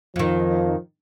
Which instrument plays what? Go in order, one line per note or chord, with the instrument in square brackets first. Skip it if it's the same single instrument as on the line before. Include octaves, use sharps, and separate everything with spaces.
[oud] F2 D#3 [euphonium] F3